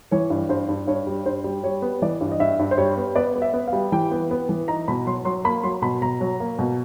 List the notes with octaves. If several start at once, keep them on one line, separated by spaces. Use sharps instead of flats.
E3 C#5
G2
G2 C5
G2
G2 C#5
G3
G2 C5
G3
G3 C#5
B3
E3 D5
G2
D#5
G2 E5
G2
C5
G3 C#5
B3
B3 D5
B3
E5
B3
F5
G3
E3 G5
B3
B3
E3
D#4 A#5
B2 B5
F#3 C6
F#3 C6
A#3 B5
F#3 C6
B2 B5
B2 A#5
F#3
A#3
B2